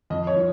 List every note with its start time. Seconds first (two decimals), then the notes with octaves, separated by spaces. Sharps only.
0.10 F2 D#5
0.27 C#5
0.36 F3